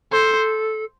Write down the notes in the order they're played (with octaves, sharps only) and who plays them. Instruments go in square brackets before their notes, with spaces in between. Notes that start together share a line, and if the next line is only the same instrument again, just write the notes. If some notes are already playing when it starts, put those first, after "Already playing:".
[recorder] A4 [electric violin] C5